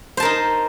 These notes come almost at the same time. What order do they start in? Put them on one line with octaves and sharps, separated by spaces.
C5 A5 A#4 D#4